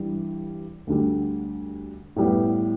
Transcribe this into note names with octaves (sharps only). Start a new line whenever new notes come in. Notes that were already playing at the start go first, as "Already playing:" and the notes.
Already playing: G2 E3 G3
D2 D3 G3
A2 G3 B3